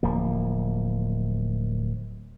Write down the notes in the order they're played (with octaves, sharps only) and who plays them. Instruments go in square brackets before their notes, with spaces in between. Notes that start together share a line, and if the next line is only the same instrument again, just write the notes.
[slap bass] D1 F3 A#3